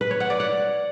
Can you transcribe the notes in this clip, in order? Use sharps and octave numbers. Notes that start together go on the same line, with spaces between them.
B4
C#5
F#5
D5
F#5